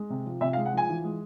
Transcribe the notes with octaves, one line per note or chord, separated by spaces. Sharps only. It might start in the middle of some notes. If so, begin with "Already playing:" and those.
Already playing: G#3
C3
F3
C3 E5
F5
G#3
F#5
F3 G#5
E3
G#3